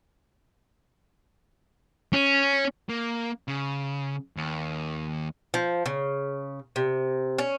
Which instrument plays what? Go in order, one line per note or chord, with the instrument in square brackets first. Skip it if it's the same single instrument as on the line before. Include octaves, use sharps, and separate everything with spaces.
[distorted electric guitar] C#4
[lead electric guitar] A#3
C#3
D#2
[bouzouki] F3
C#3
C3
C#4